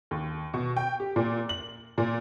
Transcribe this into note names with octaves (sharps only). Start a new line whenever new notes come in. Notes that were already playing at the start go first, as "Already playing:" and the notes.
D#2
B2
G5
G4
A#2
F#7
A#2